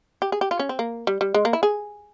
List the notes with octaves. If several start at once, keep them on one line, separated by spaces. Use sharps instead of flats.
G4
G#4
G4
F4
C#4
C4
A#3
G3
G3
G#3
A#3
E4
G#4